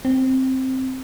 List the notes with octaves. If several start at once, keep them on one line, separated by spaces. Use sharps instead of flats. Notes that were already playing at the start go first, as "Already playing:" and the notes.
C4